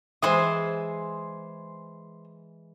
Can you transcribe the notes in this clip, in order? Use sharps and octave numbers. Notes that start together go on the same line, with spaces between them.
E3 G#3 C5 G#5 D#6